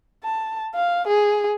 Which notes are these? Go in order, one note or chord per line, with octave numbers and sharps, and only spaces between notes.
A5
F5
G#4